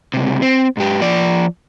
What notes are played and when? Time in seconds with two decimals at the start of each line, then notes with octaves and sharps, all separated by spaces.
0.14 C#2 C3
0.42 C4
0.77 G#2 G4
1.01 F3 D5